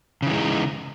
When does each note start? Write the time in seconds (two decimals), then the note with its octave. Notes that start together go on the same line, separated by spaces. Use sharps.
0.22 C#3
0.27 E3
0.31 G#3
0.35 D#4